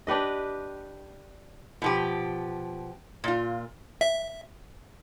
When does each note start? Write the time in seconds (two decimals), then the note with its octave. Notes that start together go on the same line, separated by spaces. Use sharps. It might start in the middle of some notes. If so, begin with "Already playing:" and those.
0.07 D4 G4 B4 D#5
1.82 B2 F3 G4
3.24 A#2 F4
4.01 E5